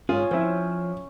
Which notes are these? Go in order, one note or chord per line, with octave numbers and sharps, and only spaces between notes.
G#2 C#4 F4 G#4
F3 C4 E4